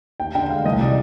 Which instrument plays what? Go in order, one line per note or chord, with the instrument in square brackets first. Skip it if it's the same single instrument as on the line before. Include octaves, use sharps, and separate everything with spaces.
[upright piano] D#2 G5
D3 G5
G#3 F5
C2 D#5
C3 D5